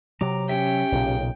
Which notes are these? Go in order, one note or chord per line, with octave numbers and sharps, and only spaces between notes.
C3 F#3 A#5 D6
C#4 G4 E5 G5
B1 A#2 C#3